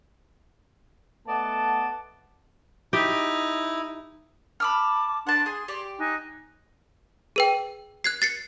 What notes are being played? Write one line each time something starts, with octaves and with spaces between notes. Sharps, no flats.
A3 B3 D5 D#5 F#5 A5
D#4 E4 G4
A5 B5 D6 E6 F6
D4 F#5 A5 C6
G#4 C6
G4 D5
D#4 G#5 F#6
G#4 B4 G5
F#6 G#6 C7
A6 C7 C#7